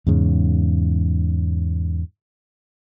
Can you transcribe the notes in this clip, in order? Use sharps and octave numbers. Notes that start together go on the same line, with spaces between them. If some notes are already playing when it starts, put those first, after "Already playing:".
E2 G#2 C#3